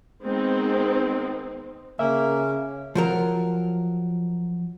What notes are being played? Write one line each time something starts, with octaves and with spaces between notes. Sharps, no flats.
D#3 G#3 B3 C4 D#4
C#3 A#3 C#4 E5
F3 F#3 A#4